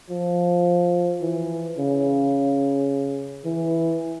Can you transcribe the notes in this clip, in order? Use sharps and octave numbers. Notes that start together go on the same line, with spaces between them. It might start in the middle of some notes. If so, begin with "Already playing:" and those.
F3
E3
C#3
E3